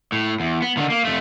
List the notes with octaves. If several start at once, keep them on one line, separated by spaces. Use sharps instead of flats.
A2
E2
B3
D3 D#3
A#3
F2 A3